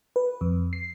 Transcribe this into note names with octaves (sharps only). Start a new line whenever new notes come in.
B4
F2
C7